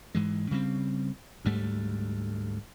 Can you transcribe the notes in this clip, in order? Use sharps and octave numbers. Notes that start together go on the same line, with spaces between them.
G#2 E3 G#3
C#3 G3 B3 C4
D2 G#2 G3 A3